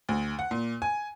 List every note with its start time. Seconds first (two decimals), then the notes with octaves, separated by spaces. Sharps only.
0.09 D2
0.39 F#5
0.51 A#2
0.82 G#5